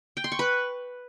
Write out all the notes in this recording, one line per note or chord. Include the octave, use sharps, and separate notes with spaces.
G5
C6
C#6
B4